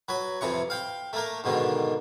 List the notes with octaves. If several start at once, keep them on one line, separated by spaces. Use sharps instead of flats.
F#3 B4
F2 C3 E3 C#6
F5 G5
A3 A#3 A#4
G#2 B2 D3 D#3